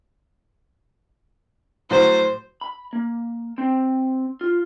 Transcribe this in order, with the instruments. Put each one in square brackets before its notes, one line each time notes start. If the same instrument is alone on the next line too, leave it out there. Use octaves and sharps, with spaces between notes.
[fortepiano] A2 F#3 [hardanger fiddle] C5
[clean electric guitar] B5
A#3
C4
F4